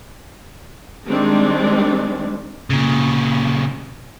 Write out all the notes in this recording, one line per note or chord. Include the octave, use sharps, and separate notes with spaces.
D#3 G3 G#3 C4 D4
A#2 C#3